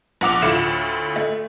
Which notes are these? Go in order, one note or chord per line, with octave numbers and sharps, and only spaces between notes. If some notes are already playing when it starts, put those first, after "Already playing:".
A#1 F#5 D6 F7
D2 A2 E4 F4 C#7 E7
A3